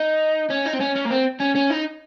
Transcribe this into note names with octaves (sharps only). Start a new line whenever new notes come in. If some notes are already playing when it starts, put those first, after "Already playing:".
Already playing: D#4
C#4
D#4
C4
C#4
C#4
A#3
C4
C#4
C#4
D#4